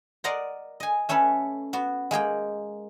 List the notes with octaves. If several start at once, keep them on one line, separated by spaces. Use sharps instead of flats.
A#4 D5 D#5 F#5 A#5 C6
D#5 G#5
A3 C#4 A4 B4 C#5
B3 F#4
G#3 A#3 G#4 G5